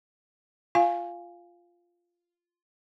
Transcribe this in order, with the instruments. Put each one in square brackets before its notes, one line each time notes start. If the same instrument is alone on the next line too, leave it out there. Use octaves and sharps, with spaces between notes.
[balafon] F4 F5 G#5